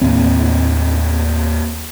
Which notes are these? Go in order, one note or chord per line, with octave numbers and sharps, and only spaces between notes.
D#2 A2 A#3 C4